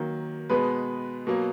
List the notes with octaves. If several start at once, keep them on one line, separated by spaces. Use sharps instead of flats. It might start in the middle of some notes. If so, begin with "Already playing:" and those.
Already playing: D#3 F#3 A#3
B2 G#3 B3 B4
B2 F#3 A#3